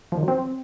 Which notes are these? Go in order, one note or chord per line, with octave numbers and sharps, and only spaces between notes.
F3
D#3
F#3
C4